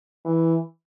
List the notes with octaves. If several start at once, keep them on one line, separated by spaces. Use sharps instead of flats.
E3